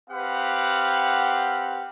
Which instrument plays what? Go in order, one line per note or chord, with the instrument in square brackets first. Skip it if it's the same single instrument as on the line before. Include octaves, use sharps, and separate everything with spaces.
[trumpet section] C4 G4 B4 F5 F#5